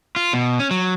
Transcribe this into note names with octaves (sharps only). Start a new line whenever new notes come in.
F4
B2
C#4
F#3